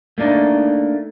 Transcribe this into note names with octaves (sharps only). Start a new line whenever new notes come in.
A3 A#3 D4 D#4